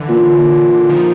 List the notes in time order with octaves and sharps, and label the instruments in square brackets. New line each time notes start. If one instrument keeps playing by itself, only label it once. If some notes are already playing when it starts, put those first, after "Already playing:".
Already playing: [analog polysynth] D3 E3
[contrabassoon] A#2
A#2
[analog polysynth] D#3 F3